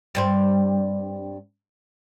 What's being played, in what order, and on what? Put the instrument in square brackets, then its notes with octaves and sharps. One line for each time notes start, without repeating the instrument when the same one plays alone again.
[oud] G2 G3 C4